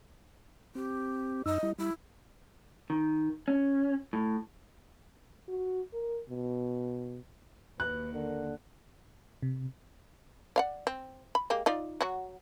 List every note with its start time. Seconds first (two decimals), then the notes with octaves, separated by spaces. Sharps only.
0.75 C4 G4
1.46 F#2 D#4 D#5 E6
1.63 G3 E4
1.79 G3 E4
2.90 D#3
3.48 C#4
4.13 A2
5.48 F#4
5.93 A#4
6.29 B2
7.80 D#2 B4 F#6
8.13 D3 A#4
9.42 C3
10.56 D5 F5 F#5
10.87 C4
11.35 B5
11.50 G#3 A#3 G4
11.66 D#4 F4 D5
12.01 F#3 F#4